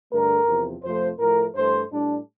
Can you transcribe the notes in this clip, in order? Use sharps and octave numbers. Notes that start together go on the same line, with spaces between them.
G2 D3 A3 A#4
E2 C3 F3
F2 C3 F3 A3 C5
A2 F3 A3 A#4
G2 E3 A3 C5
A2 G3 D4